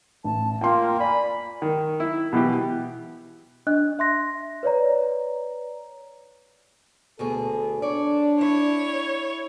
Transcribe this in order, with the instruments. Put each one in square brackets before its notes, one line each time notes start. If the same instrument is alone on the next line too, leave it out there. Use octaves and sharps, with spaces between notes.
[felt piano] A1 [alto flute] A5
[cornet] A#3 [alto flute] F4 [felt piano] G5 C6
[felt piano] D5 [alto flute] G#5 [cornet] B5
[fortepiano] D#3
E4
B2 E3 G4
[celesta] D4 D#5 F#6
E5 C6 A#6
B4 C#5 D5 A#5
[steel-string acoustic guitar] D2 B2 G#4 [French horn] A4
[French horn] D4 [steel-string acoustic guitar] C#5 D5
[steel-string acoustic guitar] E4 [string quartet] C#5